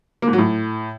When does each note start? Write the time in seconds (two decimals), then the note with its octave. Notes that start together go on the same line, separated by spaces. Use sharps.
0.22 A#3
0.28 G#2
0.33 F#3
0.38 A2